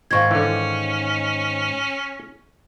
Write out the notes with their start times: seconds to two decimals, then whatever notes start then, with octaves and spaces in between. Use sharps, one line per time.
0.11 G#2 D#3 F5 C#6 G#6
0.31 D3 E3 C#4